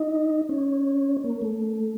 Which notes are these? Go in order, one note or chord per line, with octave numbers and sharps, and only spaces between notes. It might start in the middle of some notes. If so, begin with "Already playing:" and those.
Already playing: D#4
C#4
A#3
A3